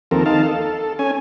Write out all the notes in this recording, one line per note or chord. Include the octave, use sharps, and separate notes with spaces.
D#2 F3 C4 A4 A#4
D#4 F5 A5
A4
C#4 G#5